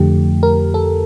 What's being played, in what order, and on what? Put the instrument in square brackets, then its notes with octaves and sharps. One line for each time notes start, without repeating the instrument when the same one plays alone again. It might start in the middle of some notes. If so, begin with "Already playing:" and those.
Already playing: [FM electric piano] F2 D3 F3 A3 G4
A#4
A4